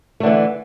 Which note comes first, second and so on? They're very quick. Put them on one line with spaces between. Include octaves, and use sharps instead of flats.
A3 D3 E3